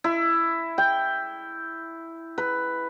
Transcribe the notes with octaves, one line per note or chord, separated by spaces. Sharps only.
E4
G5
B4